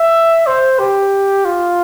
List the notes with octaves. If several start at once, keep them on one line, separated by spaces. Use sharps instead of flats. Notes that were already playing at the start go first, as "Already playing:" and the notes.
Already playing: E5
C5
G4
F4